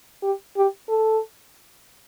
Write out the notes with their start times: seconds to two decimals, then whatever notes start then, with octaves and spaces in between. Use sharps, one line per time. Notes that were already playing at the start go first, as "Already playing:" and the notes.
0.22 G4
0.56 G4
0.89 A4